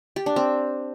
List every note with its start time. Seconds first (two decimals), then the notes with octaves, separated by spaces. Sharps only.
0.16 G4
0.26 D4
0.36 C4